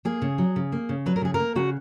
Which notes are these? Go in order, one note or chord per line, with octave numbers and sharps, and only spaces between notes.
A#3 G#4
C#3
F#3
C#3
A#3
C#3
F#3 B4
A#4
C#3 G#4
A#4
A#3
C#3 F#4